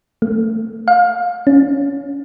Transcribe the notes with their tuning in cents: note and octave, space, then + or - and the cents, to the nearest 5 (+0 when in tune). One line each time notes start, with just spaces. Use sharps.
A3 +20
F5 +30
C#4 +15